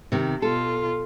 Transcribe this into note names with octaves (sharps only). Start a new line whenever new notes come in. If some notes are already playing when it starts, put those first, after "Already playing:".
C3 D#3
B2 F4 A4